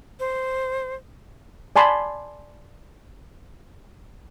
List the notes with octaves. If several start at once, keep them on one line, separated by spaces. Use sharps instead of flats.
C5
D5 G#5 A5 B5 C6